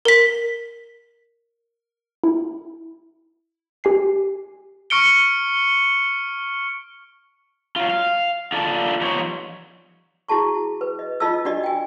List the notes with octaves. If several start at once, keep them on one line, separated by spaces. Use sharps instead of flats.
A#4 B6
E4
G4 G#5 C7
C#6 F6 C#7 D7 G7
F#3 F4
F5
F4 A4 D5 A5
F3 G3 B3 D#4 C5 C#5
E4 F#4 G#4 A5 C#6
B4
D#5
D#4 F4 D#5 A5 D#6 E6
D4 F#4 G4 D5 D#5
G5 G#5